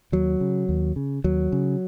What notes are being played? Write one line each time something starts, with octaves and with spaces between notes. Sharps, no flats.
D#2 F#3
C#3
D#2
C#3
D#2 F#3
C#3